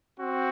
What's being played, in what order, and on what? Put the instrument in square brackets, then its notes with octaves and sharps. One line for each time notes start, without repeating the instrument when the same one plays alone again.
[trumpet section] C4 F#4